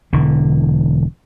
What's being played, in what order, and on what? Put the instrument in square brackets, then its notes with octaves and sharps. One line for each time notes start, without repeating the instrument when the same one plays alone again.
[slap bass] E1 D3 E3